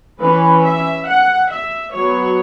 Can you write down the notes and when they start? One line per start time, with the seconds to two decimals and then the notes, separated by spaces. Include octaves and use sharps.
0.20 E3 C#4 B4
0.63 E5
1.07 F#5
1.50 E5
1.94 F#3 B3 C#5